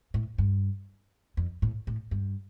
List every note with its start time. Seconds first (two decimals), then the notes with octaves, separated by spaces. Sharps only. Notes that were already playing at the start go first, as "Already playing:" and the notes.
0.14 A2
0.38 G2
1.37 F2
1.62 A2
1.87 A2
2.11 G2